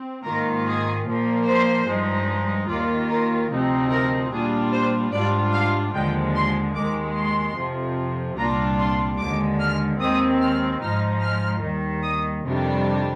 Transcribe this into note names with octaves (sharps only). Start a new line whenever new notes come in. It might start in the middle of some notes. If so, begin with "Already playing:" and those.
Already playing: C4
G#2 D#3 A#3 F4 A#4
G#4
A#2 F3 A#3
C5
G2 F3 G#3 D#4
D#2 D#3 A#3 F4 D5
A#4
D2 C3 F3 C4 D#4
A#4
A#2 G3 D4 F4 G#4
C5
G#2 G3 D4 F4 D5
F5
D#2 D3 F3 G#3 G5
C6
D#2 D#3 G#3 D6
C6
F2 C3 F3
C2 A#2 G3 D4 F4 A#5
C6
D#2 D3 G#3 D6
F6
D#2 D#3 G#3 C4 D#6
F6
G#2 F3 G#3 D#4 F6
F6
D#2 D#3 G3
D#6
F2 C3 D#3 G3 D4